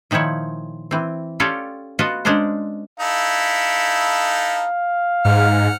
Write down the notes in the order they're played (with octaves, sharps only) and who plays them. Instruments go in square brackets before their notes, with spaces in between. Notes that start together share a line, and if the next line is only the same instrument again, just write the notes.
[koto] A#2 D#3 F3 E4 C#5
E3 C4
C#4 F4 G4 A4 C#5 D5
B3 F4 F#4 B4 D#5 A5
G#3 C#4 D4 A#4 C5
[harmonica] D#4 E4 A4 [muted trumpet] F5
[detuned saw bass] G#2 [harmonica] F#5 F6